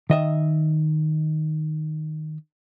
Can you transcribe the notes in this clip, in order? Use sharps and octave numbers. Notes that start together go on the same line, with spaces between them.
D#3 D#5 E5